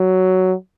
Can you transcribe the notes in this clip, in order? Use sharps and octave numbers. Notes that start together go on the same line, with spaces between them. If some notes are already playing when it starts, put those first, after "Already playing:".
Already playing: F#3